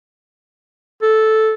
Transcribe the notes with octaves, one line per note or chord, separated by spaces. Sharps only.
A4